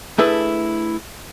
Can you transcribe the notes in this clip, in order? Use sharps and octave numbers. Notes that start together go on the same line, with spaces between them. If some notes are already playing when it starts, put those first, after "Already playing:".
A3 D4 E4 G#4 A4 B4